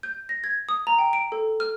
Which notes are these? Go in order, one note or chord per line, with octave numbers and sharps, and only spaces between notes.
G6
A#6
G#6
D#6
A#5
G5
D7
A4
F6